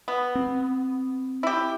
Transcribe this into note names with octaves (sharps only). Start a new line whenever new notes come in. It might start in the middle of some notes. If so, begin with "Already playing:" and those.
B3
C4
E4 G4